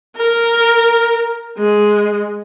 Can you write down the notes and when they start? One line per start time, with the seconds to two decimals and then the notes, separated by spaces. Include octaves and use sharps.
0.17 A#4
1.58 G#3